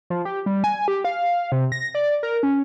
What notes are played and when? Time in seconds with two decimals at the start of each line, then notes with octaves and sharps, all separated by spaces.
0.10 F3
0.25 G4
0.46 G3
0.64 G#5
0.88 G4
1.05 F5
1.52 C3
1.72 A#6
1.95 D5
2.23 A#4
2.43 C#4